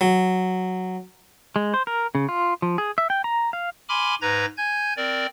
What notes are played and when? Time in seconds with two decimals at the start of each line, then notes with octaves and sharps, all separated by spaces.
0.01 F#3
1.56 G#3
1.74 C5
1.87 A#4
2.15 C#3
2.29 F4
2.62 F3
2.78 G#4
2.98 E5
3.10 G5
3.24 A#5
3.53 F5
3.89 G#5 B5 C6 D6 F6
4.22 G#2 B4 A#5 G#6 A#6
4.57 G#5 G6 G#6
4.97 C4 A#4 D5